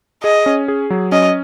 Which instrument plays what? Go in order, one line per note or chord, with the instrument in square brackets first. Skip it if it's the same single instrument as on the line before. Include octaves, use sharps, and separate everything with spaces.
[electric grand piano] G#4 [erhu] D#5
[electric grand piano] C#4
G#4
F#3
[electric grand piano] C#4 [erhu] D#5